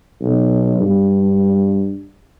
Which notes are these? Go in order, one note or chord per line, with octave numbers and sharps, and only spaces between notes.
B1
G2